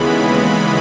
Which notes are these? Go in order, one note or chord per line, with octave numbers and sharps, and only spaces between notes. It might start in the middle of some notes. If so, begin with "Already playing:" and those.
Already playing: D#2 C#3 E3 G#3 B3 B5